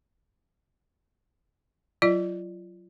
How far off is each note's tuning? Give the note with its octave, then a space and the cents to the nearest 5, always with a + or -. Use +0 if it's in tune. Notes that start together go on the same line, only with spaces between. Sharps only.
F#3 +0 F4 -20 D5 +0